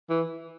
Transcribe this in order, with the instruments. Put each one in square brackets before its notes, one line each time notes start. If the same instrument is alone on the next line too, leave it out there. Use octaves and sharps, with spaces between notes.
[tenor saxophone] E3